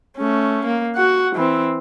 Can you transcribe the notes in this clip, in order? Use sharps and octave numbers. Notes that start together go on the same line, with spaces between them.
A3 C#4
A#3
F#4 F#5
E3 C4